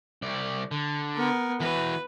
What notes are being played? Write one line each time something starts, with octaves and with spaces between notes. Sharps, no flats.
C2 D5
D3
B3 A#4
E3 F#4 B4